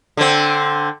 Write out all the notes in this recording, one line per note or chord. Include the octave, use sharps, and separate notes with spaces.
D3 C4